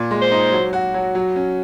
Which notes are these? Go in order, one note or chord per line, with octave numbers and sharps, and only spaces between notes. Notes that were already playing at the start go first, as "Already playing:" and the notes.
Already playing: A#2
G#3
C5
D#4
F#3
F#4
F#3
F#3
C#4